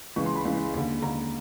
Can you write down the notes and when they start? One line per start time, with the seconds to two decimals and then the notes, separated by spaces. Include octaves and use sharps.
0.16 C#2 C#3 E3 C#6
0.26 C6
0.36 B5
0.45 C#2 C#3 E3
0.74 D#2 D3
1.02 D#2 D3 A#5